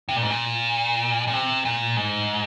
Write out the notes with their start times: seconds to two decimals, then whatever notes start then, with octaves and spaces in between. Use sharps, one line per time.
0.09 C3
0.16 A#2
0.23 G#2
0.30 A#2
1.27 A#2
1.34 C3
1.65 A#2
1.96 G#2